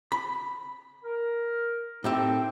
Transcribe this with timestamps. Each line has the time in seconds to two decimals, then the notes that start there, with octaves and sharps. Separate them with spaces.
0.12 B5
1.05 A#4
2.04 A2 C4 D#4 G4 E5